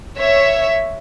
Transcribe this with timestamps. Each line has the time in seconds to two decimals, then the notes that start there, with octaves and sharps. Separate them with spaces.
0.18 C#5 E5